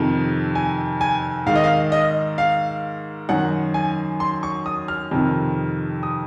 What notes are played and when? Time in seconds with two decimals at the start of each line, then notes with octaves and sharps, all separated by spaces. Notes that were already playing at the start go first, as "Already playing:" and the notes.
Already playing: F2 C3 D#3
0.55 G#5
1.01 G#5
1.46 G#2 D#3 F5
1.55 D#5
1.64 F5
1.92 D#5
2.38 F5
3.29 F#2 D#3 F#5
3.74 G#5
4.20 C6
4.43 C#6
4.66 D#6
4.88 F6
5.11 F2 C3 D#3
6.03 D#6